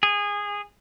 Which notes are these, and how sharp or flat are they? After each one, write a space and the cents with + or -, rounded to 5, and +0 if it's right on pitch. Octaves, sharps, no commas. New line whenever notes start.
G#4 -20